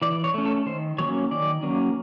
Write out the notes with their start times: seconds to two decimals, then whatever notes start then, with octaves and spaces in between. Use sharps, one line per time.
0.02 E3 D5
0.24 C#5
0.34 A3 C#4
0.45 A4
0.66 D#3 C5
0.98 F#3 A#3 C#4 C#5
1.31 D#3 D5
1.63 F#3 A#3 C#4